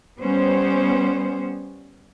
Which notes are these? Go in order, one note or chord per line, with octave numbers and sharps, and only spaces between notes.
G3 B3 C#4 C5